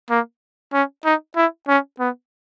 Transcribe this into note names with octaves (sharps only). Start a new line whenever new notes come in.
A#3
C#4
D#4
E4
C#4
B3